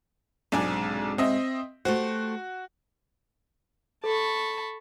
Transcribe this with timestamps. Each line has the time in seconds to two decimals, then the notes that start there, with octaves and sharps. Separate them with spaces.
0.52 B1 G#2 C3 G#3 D4 G#5
1.18 C4 D#5 E5
1.85 A3 F#4 G4 C5
4.04 A4 A5 B5 C#6